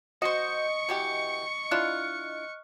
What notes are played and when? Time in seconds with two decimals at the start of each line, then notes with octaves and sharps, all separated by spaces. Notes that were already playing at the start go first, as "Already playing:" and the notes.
0.22 F#4 C5 D#5 C#6 C#7
0.89 B2 E3 G4
1.71 D4 E4 F4 F6 F#6